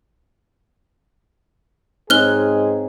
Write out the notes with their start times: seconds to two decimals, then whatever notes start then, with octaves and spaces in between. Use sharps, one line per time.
2.10 G#2 C4 D#4 G#4 C#5 F6 F#6 G7